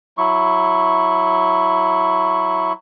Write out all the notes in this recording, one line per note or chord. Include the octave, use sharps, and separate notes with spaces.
F#3 E4 C#6